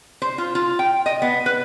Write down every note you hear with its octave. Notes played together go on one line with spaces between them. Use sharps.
C5
F4
F4
G5
D#5
B3
B4